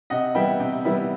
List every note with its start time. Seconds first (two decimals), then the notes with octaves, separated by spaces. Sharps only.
0.10 C3 D#5 F#5
0.35 E3 G3 B3 E4 E5 G5
0.60 C3
0.85 E3 G3 B3 E4